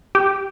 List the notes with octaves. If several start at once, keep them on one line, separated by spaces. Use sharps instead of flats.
G4